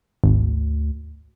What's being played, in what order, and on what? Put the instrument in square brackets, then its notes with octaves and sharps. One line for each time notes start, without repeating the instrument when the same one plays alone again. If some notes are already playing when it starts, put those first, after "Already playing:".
[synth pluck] G#1 [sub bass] D2